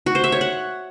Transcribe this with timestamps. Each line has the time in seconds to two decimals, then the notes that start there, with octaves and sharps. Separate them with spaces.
0.06 F#4
0.15 C5
0.24 E5
0.32 C#5
0.41 F#5